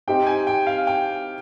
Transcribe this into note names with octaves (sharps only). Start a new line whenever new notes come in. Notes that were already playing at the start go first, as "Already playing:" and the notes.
C4 D#4 G4 C5 D#5 G5
G#5
G5
F5
G5